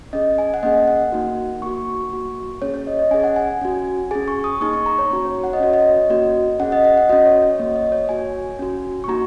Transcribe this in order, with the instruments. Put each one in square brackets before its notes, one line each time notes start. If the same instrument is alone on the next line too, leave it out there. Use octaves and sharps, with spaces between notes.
[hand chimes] C#4 G#4 D#5
G#5
F#5
A#3 C#4 G#4 D#5
F#5
A#3 D#4 F#4
A#3 F#4 C#6
A#3 F#4
A#3 C#4 G#4 C#5
C#5
D#5
D#5
C#4 G#4 G#5
F#5
G#5
C#4 F#4
C#4 G#4 G#5
C#6
D#6
A#3 D#4 G#4 C#6
C#6
A#5
C#5
A#3 C#4 F#4 C#5
C#5
F#5
D#5
C#4 F#4 C#5
D#5
A#3 C#4 F#4
C#4 G#4 F#5
D#5
F#5
F#5
C#4 F#4 D#5
C#5
C#5
A#3 F#4 D#5
D#5
C#5
A#3 F#4 G#5
C#4 F#4
C#6
A#3 D#4 F#4 A#5